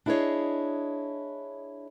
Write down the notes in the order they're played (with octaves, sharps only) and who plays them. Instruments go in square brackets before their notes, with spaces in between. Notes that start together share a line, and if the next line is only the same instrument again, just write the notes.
[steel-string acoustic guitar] D4 E4 G#4 B4 C#5 D#5